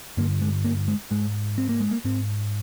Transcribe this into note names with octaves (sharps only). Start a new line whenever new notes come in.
G2 D3 A#3
G#3
A#3
G#3
G#2 G#3
C4
A#3
G#3
A#3
G#2 C4